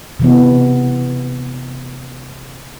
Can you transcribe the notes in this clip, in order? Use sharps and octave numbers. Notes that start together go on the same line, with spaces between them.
C3 E3 B3